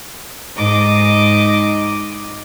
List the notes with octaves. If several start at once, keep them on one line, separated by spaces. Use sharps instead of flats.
G#2 D#5 D6